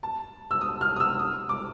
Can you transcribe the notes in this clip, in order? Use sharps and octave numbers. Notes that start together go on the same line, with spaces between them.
A5
E6
D#6
F6
D#6
E6
D#6
D6